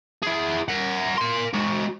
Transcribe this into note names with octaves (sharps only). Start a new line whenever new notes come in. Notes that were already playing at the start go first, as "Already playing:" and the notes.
E4 G#4
A#4 F#5
A#4 C6
G#3 F#4